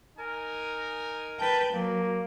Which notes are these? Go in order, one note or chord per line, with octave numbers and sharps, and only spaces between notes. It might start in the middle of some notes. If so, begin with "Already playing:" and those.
D#4 A#4 G#5
B4 G5 A5
F#3 A#3